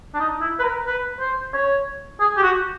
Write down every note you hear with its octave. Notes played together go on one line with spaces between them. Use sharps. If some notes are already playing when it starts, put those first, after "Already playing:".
D4
D#4
E4
B4
A#4
B4
C5
C#5
G#4
G4
F#4